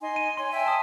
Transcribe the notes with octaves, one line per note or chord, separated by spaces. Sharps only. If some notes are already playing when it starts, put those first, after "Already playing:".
D#4 G#5 C6
D#7
C#5 G#5 C6
E5 G5 G#5
A5 D#6